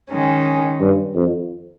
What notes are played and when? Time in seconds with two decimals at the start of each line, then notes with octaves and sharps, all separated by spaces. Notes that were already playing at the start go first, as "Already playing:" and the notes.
0.10 D#3 G#3 C#4
0.81 G2
1.15 F2